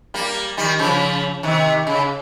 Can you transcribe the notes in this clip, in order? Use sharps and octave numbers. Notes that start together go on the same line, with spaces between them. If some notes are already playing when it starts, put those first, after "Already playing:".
G3 A#3
D#3 G3
C#3 F3
C3 D#3
C#3